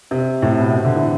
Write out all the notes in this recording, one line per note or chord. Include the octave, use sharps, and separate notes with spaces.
C3
A2
B2
C3
D3
E3